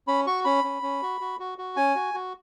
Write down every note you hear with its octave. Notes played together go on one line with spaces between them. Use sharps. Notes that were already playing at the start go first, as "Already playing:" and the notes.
C#4 B5
F#4 C#6
C#4 B5
C#4
C#4
F#4
F#4
F#4
F#4
C#4 G#5
F#4
F#4